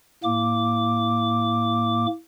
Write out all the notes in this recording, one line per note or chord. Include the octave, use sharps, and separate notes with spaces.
A2 A#3 D6